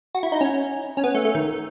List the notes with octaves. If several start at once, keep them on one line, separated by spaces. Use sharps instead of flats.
F#4
E4
D#4
C#4
C#4
B3
A3
A3
D#3